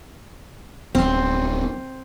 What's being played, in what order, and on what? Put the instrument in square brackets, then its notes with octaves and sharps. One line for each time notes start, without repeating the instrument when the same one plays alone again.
[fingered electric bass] D1 B3 [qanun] C4